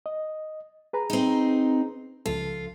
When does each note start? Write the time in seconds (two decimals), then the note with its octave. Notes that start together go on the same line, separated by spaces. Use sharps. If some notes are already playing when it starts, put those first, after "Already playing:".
0.06 D#5
0.93 G#4 B4 A#5
1.10 C4 D#4
2.26 C#2 F3 F4 A4